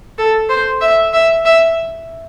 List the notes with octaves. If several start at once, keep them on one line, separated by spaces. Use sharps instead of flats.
A4
C5
E5
E5
E5